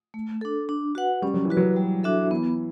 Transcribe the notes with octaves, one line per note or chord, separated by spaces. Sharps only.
A3
D4 A4
D4
F#4 B4 F#5
G3 C#4
F#3
E3
F#4 B4
F#3
G3
D4 F#4 A4 E5
E3 B3